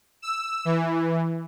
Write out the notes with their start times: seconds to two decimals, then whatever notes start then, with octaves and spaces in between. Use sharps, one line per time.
0.22 E6
0.65 E3